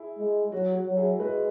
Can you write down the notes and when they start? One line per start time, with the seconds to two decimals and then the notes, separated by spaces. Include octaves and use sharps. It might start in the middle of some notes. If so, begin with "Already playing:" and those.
Already playing: E4 G#4
0.19 G#3
0.52 F#3 F#4
0.75 F#4
0.86 F#3
0.97 E4 G#4
1.19 G#3 F#4 B4